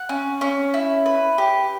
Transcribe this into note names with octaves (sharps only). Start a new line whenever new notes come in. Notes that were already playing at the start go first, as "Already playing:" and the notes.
Already playing: F#5
C#4
C#4
E4
B4
G4